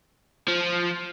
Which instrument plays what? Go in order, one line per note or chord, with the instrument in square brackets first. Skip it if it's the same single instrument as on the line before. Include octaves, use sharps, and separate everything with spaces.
[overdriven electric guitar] F3